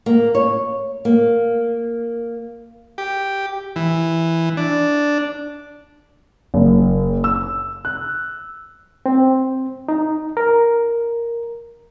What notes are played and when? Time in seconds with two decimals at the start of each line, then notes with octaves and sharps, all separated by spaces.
0.06 A#3
0.35 C#5
1.05 A#3
2.98 G4
3.76 E3
4.57 D4
6.54 F#1
7.24 E6
7.85 F#6
9.06 C4
9.89 D#4
10.37 A#4